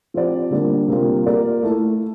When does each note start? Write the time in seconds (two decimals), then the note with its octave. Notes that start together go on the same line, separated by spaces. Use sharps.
0.14 F3 C4 G4 D5
0.51 D3 G3 A#3 D4
0.88 C3 G3 A#3 F4
1.26 A#3 F4 A#4 D5
1.63 A3 E4 A4